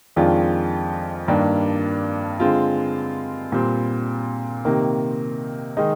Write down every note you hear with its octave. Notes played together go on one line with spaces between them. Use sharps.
F2 D#3 G#3 D4 F4
G2 D#3 G3 A#3 D4
D3 G#3 C4 F4
A#2 G3 C4
C3 D#3 A#3
D#3 G#3 D#4